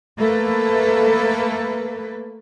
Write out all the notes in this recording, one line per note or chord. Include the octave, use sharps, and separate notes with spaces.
A3 A#3 A4 B4